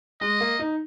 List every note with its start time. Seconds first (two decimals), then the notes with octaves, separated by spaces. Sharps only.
0.21 G#3 D#5
0.41 A#3
0.59 D#4